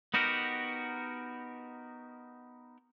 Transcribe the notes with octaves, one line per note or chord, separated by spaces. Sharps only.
B3 D#4 F#4 G4 A#4